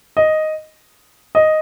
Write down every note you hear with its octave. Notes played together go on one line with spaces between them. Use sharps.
D#5
D#5